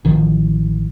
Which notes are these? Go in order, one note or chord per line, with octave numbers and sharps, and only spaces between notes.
A1 D#3 F3